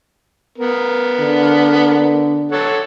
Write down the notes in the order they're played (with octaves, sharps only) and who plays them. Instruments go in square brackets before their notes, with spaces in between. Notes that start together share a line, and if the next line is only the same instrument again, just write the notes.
[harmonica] B3 A#4
[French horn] D3
[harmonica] A4 C#5 F#5